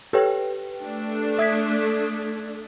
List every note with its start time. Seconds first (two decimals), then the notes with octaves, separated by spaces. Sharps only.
0.13 G4 A4 B4 C#5 G5
0.81 A3 D4
1.39 E5 D#6 G#6 B6